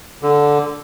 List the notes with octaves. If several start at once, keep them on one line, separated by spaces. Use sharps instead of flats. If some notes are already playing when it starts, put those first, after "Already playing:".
D3